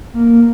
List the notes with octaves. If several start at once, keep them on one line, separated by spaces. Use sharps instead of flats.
A#3